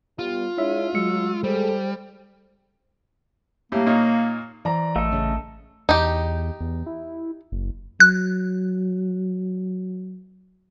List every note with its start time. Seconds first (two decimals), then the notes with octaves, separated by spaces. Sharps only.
0.19 G3 B3 F4
0.58 G#3 D4 E4 C#5 E5
0.94 F#3 G#3 E6 C#7
1.43 G3 G#4 A4 C5
3.72 A2 G3 A#3
3.86 A#2 D#4 C#5
4.65 E3 C5 D5 A#5
4.96 A1 A3 A4 D#5
5.12 C#3 C#4
5.89 E2 D#4 G4
6.61 E2
6.86 E4
7.52 F#1
8.00 F#3 F#6